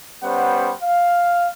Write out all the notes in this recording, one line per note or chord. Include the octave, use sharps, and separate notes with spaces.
G3 B3 C#4 C5 F#5
F5